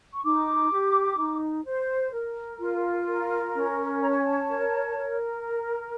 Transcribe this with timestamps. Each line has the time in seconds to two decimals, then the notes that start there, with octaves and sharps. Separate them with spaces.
0.13 C#6
0.24 D#4 D6
0.71 G4
1.18 D#4
1.66 C5
2.13 A#4
2.60 F4
3.07 A#4
3.54 C#4
4.01 C#5 A#5
4.09 A5
4.17 G#5
4.24 A5
4.49 A#4
4.96 A#4